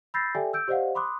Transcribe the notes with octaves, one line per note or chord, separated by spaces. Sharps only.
B5 E6 G6 A6 A#6 C7
G4 A4 D5 E5 G5 G#5
E6 G6 D7
G4 C5 D5 D#5 F5 F#5
B5 C6 D6 D#6 F#6